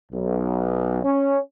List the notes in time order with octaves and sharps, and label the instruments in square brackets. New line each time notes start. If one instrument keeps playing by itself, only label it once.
[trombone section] B1
C#4